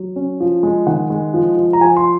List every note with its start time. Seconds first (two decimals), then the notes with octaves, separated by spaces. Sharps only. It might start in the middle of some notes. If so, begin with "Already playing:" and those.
Already playing: F#3
0.16 C#4
0.40 F3
0.63 G#3
0.87 D#3 F#5
1.10 G#3
1.34 F3
1.57 F3
1.73 A#5
1.81 F3 G#5
1.97 C6